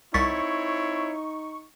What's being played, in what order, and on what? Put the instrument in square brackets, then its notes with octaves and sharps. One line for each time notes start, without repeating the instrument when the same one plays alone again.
[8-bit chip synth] C2 A6 B6 [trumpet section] C4 E4 C#5 [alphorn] D#4 [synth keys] C#6